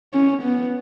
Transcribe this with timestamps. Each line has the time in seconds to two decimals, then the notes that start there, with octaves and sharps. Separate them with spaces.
0.13 C#4
0.42 B3